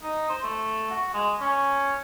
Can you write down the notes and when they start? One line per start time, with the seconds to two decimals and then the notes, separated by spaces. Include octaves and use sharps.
0.03 D#4
0.29 C5
0.43 A3
0.90 F#4
1.14 G#3
1.40 C#4